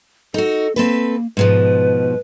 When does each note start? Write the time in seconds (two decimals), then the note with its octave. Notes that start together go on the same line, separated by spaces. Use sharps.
0.34 D#4 F#4 A4
0.76 A#3 C4 A4 B4
1.37 G#2 B2 F3 B4